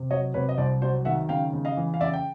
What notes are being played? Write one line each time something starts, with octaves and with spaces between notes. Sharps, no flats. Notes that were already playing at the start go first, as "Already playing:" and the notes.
Already playing: C3
F#3 C#5 D#5
C3 B4 C#5
D#5
C2 C5 D5
F#3 C5 D5
D#3 E5 F#5
C#3 F5 G5
C#3
D#5 F5
E3
F5
C#3 D5 E5
G5